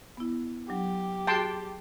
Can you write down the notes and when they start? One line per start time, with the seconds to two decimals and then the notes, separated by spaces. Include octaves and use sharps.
0.17 B3 E4
0.69 F#3 D4 G4
1.27 F#4 G#4 G5 A5 C6